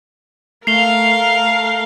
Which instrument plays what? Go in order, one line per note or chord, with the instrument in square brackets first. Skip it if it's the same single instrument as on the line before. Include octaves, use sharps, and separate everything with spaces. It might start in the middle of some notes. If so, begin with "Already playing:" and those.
[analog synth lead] A3 [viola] A#4 F5 [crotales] C7 F7 G7